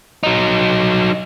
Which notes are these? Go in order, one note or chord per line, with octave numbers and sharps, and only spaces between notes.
F#3 D#4